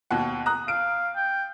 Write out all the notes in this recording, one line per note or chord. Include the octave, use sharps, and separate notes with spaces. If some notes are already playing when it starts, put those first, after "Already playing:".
D#2 B2 F#5
A#5 D#6 F#6
F5 D7
G5